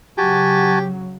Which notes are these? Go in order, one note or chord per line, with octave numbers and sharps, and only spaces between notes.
C#3 F#3 F#4 G4 G#5 A5